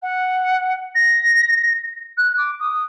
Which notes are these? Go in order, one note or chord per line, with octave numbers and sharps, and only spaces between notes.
F#5
A#6
F#6
D6
D#6